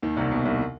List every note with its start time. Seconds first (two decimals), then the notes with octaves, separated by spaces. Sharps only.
0.02 D#2 D#3
0.17 C2 C3
0.31 B2
0.45 C2 C3